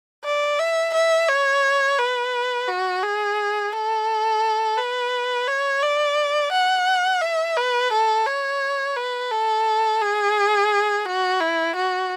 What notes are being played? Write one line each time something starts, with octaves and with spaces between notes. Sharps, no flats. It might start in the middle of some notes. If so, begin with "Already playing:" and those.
D5
E5
E5
C#5
B4
F#4
G#4
A4
B4
C#5
D5
F#5
E5
B4
A4
C#5
B4
A4
G#4
F#4
E4
F#4